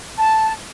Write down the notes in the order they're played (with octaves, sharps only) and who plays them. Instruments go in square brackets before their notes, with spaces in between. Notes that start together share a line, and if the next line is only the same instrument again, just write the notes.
[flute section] A5